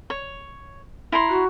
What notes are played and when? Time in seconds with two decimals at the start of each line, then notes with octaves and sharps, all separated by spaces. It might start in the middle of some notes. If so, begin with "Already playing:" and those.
0.10 C#5
1.12 E4 A#5 C6
1.29 F#4